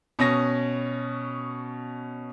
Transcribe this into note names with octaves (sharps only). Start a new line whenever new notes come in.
B2 C#4 D#6 A#6